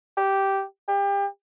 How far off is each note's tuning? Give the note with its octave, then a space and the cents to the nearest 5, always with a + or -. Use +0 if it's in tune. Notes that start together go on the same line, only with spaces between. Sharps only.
G4 -10
G4 +30